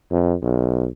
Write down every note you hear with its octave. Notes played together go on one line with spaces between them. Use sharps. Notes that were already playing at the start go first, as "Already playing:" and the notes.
F2
B1